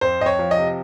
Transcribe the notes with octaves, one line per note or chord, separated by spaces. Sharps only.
F2 C5
F2 D#5
C#5
F3
D#5
C3